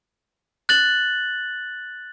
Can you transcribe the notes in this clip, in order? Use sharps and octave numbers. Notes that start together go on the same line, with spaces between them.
F#6 A6 F#7